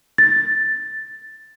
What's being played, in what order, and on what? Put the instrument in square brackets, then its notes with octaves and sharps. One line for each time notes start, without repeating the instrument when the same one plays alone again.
[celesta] A6